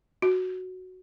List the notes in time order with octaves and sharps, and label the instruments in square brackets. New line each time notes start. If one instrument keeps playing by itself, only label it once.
[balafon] F#4